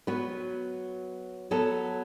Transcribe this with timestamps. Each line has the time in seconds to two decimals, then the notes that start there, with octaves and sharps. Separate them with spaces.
0.07 F#3 B3 F#4 B4
1.51 F#3 B3 A4